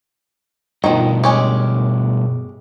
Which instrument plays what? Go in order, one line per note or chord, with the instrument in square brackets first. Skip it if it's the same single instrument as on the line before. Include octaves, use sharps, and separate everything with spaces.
[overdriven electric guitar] G2 B2 [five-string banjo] D#3 F3
[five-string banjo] G#3 C#4 G4